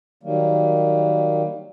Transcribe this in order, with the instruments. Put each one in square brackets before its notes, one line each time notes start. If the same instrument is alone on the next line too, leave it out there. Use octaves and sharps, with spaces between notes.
[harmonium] D#3 F#3 G3 A#3